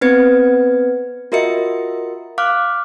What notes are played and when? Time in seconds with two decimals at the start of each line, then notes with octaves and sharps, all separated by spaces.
0.01 B3 C4 B4 G#6 C#7
1.32 F4 F#4 A#4 D#5 E5 C#7
2.38 F5 D6 F6 F#6